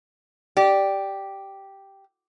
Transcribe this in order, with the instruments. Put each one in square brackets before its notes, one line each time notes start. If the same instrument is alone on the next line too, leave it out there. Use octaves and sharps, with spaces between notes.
[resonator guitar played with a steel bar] G4 [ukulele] D5